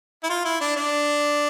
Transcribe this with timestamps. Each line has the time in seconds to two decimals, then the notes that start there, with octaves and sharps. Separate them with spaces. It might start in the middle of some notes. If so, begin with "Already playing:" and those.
0.24 E4
0.30 F4
0.45 E4
0.61 D4
0.76 D4